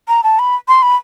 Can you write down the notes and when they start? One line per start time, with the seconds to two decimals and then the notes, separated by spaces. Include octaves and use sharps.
0.08 A#5
0.24 A5
0.39 B5
0.68 C6
0.82 B5